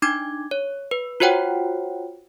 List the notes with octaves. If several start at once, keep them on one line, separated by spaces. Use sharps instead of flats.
D4 D#4 D6 G#6
C#5
B4
F4 F#4 C5 C#5 F#5 G5